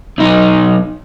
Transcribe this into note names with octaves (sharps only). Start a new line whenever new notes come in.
B1 D#4